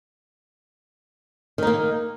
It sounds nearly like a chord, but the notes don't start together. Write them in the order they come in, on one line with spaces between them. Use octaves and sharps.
D#3 D#4 A#3